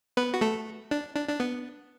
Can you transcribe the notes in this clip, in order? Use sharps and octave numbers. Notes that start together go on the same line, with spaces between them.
B3 B4
F#4
A3 A4
D4
D4
D4
B3